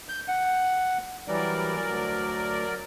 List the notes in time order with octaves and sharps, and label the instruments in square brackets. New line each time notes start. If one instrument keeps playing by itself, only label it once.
[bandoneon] G6
F#5
[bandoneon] E3 G3 [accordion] F#3 A#4 D5
[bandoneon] D2